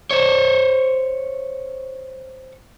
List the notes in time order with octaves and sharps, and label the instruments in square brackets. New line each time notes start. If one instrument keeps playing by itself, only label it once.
[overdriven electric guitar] C5 C#5